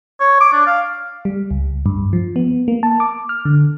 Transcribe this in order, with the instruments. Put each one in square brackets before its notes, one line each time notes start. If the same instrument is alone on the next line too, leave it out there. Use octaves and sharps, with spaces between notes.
[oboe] C#5
D6
D4
F5
[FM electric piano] G3
C#2
G2
F3
B3
A#3
A5
D6
F6
D3